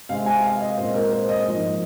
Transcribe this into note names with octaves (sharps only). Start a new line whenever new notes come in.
C3 G#3 C4 F5
G#5
F5
D#5
A#2 G#3 C4 C5
A#4
C5
D#5
G#2 F3 A#3